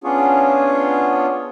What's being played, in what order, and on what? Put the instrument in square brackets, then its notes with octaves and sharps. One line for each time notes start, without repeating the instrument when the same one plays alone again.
[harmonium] B3 C#4 D4 F4 G#4 C#5